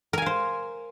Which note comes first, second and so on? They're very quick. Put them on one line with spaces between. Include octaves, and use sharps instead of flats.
A#4 G#5 F5 C5